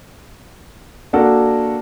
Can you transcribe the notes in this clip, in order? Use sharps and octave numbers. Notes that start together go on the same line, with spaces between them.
A#3 D4 F#4 A4 A#4